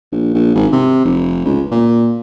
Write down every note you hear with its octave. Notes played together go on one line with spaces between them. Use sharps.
A#1
A#1
G#1
C3
F1
C#2
A#2